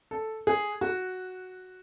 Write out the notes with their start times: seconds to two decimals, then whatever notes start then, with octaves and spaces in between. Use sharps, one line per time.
0.11 A4
0.47 G#4
0.81 F#4